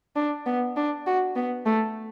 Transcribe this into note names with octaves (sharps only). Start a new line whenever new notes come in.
D4
B3
D4
F#4
B3
A3